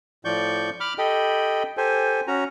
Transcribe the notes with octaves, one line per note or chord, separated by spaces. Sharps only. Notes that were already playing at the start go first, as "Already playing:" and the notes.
A2 F3 D5 C#6 G6
B5 D6 F6
G4 A4 D#5 G5 B5
G4 A4 C5 G#5
C#4 F#4 A#5